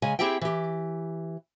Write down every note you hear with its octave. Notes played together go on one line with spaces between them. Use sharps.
C#3 G#3 G#5
C4 E4 G4 G#4 E5 G5
E3 G4